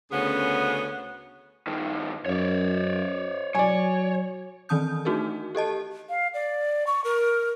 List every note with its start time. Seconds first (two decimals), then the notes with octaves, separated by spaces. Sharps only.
0.12 D2 C#3 B3 C#4 G#4
1.67 G2 D#3
2.26 F#2 C#5 D5
3.55 F#3 C#5 D5 G#5
4.69 D#3 E3 C4 A5 D#6 G6
5.05 A3 D4 D#4 F#4 G#4 A#4
5.55 G4 A4 D#5 A5
6.09 F5
6.34 D5
6.87 C#6
7.04 A#4